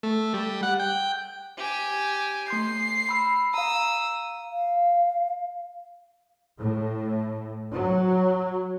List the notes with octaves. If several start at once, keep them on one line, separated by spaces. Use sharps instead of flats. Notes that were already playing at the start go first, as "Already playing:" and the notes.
A3
G3
F#5
G5
G4 G#5
A3 C6 G6 C7
B5 E6
F5 A#5 D#6 E6
F5
A2
F#3